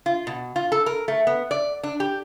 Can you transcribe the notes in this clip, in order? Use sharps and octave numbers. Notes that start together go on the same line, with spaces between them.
F4
B2
F4
A4
A#4
A3
B3
D5
D4
G4